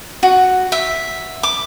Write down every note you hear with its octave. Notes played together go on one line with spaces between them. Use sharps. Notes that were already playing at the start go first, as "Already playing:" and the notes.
F#4
E5
D6